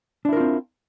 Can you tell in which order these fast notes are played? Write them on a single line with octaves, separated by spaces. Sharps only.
D4 E4 A#4 F4 C4